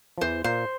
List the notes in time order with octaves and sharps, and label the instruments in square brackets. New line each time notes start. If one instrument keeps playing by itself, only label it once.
[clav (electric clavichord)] F3
[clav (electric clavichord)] E2 E3 [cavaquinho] C5
[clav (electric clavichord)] A#2 A#3 [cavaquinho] C5